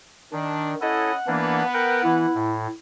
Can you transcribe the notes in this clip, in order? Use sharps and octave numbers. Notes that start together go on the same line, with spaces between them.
D#3 D4
C#4 E4 A4 C#5 D#5 F#5
E3 A#3 B3 D4
A#4 B4 G5
E3 E4
A2